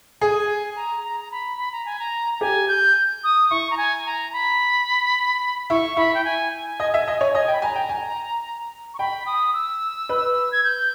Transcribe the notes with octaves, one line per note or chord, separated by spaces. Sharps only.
G#4 G#5
A#5
A#5
A#5
B5
B5
A#5
G#5
A#5
A#5
G4 G#5
G6
D#6
E4 C#6
A#5
G#5
A#5
B5
E4 C#6
E4 B5
G5
G#5
G#5
D#5
E5
D#5
C#5
D#5 G#5
G5
B5
G#5 A#5
G5
G#5
C#6
G5 B5
D#6
E6
B4
G#6
G6